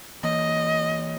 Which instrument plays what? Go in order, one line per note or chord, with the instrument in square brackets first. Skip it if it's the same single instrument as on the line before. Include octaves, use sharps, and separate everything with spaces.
[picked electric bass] E3 A#3 [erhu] D#5